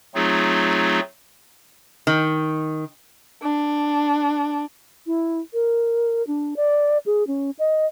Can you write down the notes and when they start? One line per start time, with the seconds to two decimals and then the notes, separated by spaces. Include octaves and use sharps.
0.15 F#3 A3 C4 D#4 F4 G#4
2.07 D#3
3.43 D4
5.07 E4
5.53 A#4
6.27 D4
6.56 D5
7.06 G#4
7.27 C#4
7.59 D#5